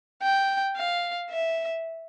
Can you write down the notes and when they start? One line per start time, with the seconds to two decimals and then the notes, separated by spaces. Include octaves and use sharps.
0.22 G5
0.77 F5
1.30 E5